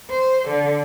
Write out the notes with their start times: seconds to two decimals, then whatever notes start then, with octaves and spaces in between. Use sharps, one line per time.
0.10 C5
0.48 D3